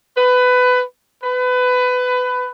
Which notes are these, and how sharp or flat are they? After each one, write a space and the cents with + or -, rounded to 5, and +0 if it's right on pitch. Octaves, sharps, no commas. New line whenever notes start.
B4 +20
B4 +20